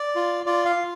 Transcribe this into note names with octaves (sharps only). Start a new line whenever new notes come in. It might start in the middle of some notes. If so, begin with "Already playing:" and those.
Already playing: D5
F4
F4 D5
F5
F4